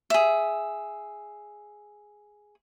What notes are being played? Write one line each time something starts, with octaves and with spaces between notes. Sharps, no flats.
G#4 E5